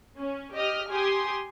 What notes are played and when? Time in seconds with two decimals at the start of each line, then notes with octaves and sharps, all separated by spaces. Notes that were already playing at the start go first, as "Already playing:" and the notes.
0.19 C#4
0.54 G4 D#5 D#6 F6
0.90 G4 G#5 C6 D#6